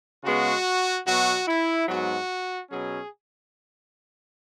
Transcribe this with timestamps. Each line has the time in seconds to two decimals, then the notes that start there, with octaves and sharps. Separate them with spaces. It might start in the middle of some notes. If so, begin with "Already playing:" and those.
0.24 C#3 G#3 B3 F#4
1.06 B2 F#3 B3 F#4
1.48 E4
1.88 G#2 F#3 B3 F#4
2.70 B2 F#3 C#4 G#4